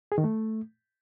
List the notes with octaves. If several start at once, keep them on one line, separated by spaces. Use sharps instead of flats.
G#4
D#3
A3